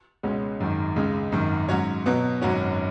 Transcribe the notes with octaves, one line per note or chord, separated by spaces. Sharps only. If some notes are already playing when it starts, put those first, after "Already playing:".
C#2 B2 G#3 C#4
G#1 F#2 D#3
C#2 C#3 G#3
G#1 F#2 D#3
G#2 F#3 C#4 F#4 C#5
B2 F#3 B3
G#1 F#2 F#3 C#4 F#4